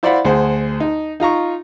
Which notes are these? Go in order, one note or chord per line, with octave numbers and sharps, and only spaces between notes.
E4 C5 D5 F5 F#5 B5
D2 G#4 C5 F#5
D#4
D#4 F4 A#5 C#6